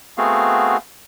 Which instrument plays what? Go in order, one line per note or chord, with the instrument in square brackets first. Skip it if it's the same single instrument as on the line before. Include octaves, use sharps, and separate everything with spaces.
[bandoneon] A3 B3 C4 F#4 G#4 F5